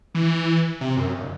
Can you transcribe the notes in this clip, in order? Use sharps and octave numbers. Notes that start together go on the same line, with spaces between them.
E3
C3
F#2
D1